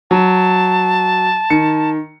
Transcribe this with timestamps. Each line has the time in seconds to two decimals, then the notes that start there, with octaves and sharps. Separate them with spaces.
0.11 F#3 A5
1.50 D#3 C#7